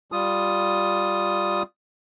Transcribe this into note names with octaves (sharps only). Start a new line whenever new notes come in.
G3 F4 D#6